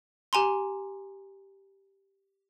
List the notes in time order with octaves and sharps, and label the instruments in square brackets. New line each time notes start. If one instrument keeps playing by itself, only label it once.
[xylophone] G4 G#5 A#5 C6